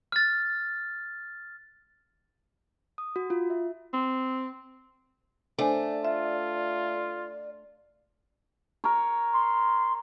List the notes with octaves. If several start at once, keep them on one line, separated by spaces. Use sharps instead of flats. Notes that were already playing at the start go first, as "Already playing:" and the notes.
F6 A6
D#6
F#4
F4
E5
C4
A3 D4 C5 D5 G#5
F4 E5
A#4 C#5
C6